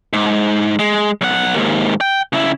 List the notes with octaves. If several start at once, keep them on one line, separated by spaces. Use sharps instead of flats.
G#2
G#3
B1 F#5
D#2 G#2
G5
C#3 E4